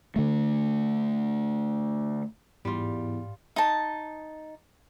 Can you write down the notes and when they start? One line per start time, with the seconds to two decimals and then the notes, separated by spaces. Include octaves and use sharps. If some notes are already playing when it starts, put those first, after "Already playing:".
0.16 D3 A3
2.65 E2 G#2 G3 F4
3.56 D#4 A5